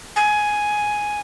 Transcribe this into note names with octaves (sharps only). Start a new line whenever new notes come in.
G#5